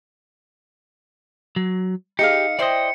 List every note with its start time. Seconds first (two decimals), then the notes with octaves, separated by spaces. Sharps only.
1.56 F#3
2.19 D#4 G4 G#4 F5 C#7
2.59 E4 C5 D5 D#5 G5